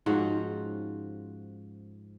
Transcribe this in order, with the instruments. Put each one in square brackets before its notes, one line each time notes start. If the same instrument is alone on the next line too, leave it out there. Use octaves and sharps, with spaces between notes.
[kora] G#2 F3 C#4 F#4